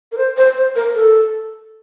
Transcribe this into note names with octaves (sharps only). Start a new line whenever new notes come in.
A#4
C5
C5
C5
A#4
A4